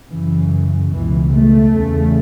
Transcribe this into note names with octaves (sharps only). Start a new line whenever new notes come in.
F#2 C#3 E3
C#2 B2 E3
A3
E2 C#3